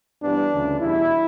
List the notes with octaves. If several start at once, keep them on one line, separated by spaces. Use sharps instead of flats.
G2 E3 G3 B3 D4
D2 C#3 E3
E2 B2 G3 E4